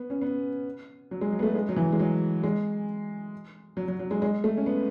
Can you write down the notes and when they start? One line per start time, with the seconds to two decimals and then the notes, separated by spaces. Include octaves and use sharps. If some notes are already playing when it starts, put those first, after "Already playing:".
Already playing: B3
0.10 C#4
0.21 B3
1.11 F#3
1.21 G#3
1.33 F#3
1.39 B3
1.43 A3
1.55 G#3
1.69 F#3
1.76 E3
1.92 G#3
1.99 F#3
2.44 G#3
3.77 F#3
3.88 F#3
3.99 F#3
4.11 G#3
4.22 G#3
4.44 A3
4.57 C#4
4.66 B3